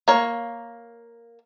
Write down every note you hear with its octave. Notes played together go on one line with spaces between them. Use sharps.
A#3 C#5